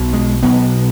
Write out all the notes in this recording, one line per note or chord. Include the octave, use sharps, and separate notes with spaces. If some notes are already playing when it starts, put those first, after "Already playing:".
Already playing: B1 B2
G#3
B1 B2 B3